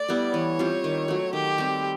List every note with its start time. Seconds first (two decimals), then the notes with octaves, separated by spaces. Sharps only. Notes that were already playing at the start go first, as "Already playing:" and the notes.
Already playing: A3 D5
0.09 G3 B3 E4
0.33 E3 C#5
0.59 G3 C4 F4
0.84 D#3
1.08 F#3 A3
1.33 D#3 G4
1.58 G3 C4